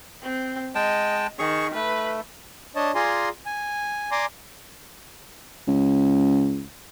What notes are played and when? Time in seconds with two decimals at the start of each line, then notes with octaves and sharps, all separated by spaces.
0.22 C4
0.75 G#3 D#5 G5 A5
1.39 D#3 G#4 C#6
1.74 A3 B4
2.76 D4 C#5 D#5 A5
2.95 F4 G#4 D5 G#5 A#5 C6
3.46 G#5
4.11 D5 G#5 A#5 C6 D6
5.68 C#2